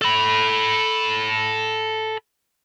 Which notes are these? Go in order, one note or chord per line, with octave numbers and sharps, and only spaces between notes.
A4 B5